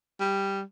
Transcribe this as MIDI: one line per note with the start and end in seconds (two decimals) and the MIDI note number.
0.20 0.62 55